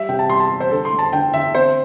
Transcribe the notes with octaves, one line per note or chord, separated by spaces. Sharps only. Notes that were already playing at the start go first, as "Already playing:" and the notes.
Already playing: G3 E5
C3 G5
A5
G3 C6
A5
G3
C5
D3 A4
C6
A3
A5
D3 G5
D3 E5
C4 C5